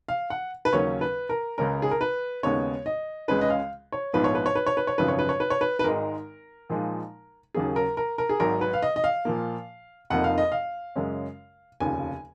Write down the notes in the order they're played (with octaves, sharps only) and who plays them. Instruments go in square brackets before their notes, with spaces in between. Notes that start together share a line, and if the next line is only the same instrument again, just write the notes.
[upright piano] F5
F#5
B4
D#2 C#3 F#3 A#3 C#4 C#5
B4
A#4
C#2 C#3 G#3 C#4 A#4
G#4
A#4
B4
D#2 C#3 G#3 B3 C#5
D#5
C#2 C#3 G#3 C#4 B4
D#5
F5
C#5
A#1 G#2 F3 B3 B4
C#5
B4
C#5
B4
C#5
B4
C#5
G#1 F#2 C#3 F3 B4
C#5
B4
C#5
B4
C#5
B4
B4
G#1 G#2 D#3 G#3 D#4 A#4
A#2 F3 G#3 D#4
D#2 C#3 F#3 A#3 G#4
A#4
A#4
A#4
G#4
G#1 G#2 F#3 A#4
B4
F5
D#5
D#5
F5
A#2 F3 A#3
F1 F2 F3 A#3 D#4 F#5
F5
D#5
F5
F#2 C#3 G#3 C#4
F1 D#2 C#3 F3 G#5